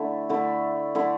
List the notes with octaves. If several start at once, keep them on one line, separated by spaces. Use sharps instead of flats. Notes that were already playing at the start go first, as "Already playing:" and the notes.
Already playing: D3 A3 E4
D3 A3 E4
D3 A3 E4